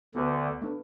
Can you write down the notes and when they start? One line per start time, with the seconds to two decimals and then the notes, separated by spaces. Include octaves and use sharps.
0.15 D2 D3 B3 F#4 B4
0.62 A3 D4 B4